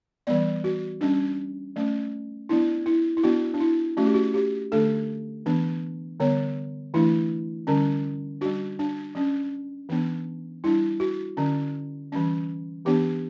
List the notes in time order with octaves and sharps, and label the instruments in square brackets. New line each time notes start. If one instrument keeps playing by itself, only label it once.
[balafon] E3 G3 B3 D5
F#4
G3 C#4 D4
F#3 A3 C#4
F#3 B3 D4 E4
E4
E4
F#3 B3 D4 F#4
D4
E4
F#3 A3 C#4 F#4
G4
F#4
G4
D3 A3 D4 A4
E3 B3 D4
D3 G3 B3 C#5
E3 A3 D4 E4
D3 G3 C#4
G3 D4 F#4
D4
F#3 C#4
E3 B3 D4
G3 D4 E4
F#4
D3 F#3 C#4
E3 G3 C#4
E3 B3 D4 G4